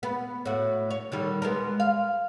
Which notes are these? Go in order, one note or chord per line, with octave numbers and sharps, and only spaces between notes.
B3
A2 F#4
C#5
D3 D#3 G3
G#3 B3 A#4
F5